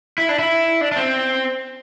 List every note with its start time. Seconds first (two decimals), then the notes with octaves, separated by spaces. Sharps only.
0.18 E4
0.29 D4
0.39 E4
0.81 D4
0.92 D4
0.96 C4